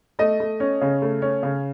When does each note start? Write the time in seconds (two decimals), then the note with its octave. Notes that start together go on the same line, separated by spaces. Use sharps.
0.19 A3 D#5
0.40 A3
0.60 C#4
0.81 C#3
1.02 A3
1.22 C#4
1.43 C#3